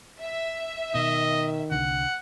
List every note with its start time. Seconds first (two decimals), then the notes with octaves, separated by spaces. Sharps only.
0.20 E5
0.95 B2 D#3 D#5
1.71 C2 D3 F#5